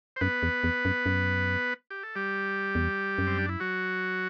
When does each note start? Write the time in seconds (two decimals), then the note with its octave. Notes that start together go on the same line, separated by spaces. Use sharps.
0.16 C5
0.21 F#2 B3 B4
0.43 E2
0.64 E2
0.85 F#2
1.06 F#2
1.91 G4
2.03 A4
2.16 G3 G4
2.75 E2
3.18 F#2
3.27 C4
3.38 D4
3.49 E4
3.60 F#3 F#4